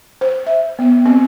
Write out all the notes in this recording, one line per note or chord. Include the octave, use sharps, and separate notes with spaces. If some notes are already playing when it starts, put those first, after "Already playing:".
C5
E5
B3
C4